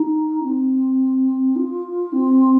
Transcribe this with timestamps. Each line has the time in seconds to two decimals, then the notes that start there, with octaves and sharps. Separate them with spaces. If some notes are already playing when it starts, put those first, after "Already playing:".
Already playing: D#4
0.43 C4
1.56 F4
2.12 C4